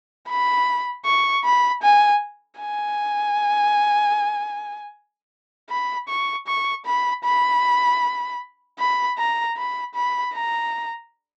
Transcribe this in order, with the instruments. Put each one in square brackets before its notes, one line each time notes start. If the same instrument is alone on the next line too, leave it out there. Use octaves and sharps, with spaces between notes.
[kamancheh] B5
C#6
B5
G#5
G#5
B5
C#6
C#6
B5
B5
B5
A#5
B5
B5
A#5